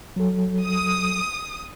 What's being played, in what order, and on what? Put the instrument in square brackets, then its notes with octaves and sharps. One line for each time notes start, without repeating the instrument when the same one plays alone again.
[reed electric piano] F#3 A4
[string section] D#6